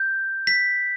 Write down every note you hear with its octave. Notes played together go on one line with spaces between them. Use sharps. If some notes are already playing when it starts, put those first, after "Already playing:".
Already playing: G6
B6